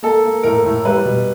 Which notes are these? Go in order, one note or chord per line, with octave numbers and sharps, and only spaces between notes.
A#3 A4
A#3
A2 A#4
A2
G3 B4
B2